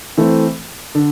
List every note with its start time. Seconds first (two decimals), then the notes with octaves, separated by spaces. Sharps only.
0.18 E3 A3 C4
0.95 D3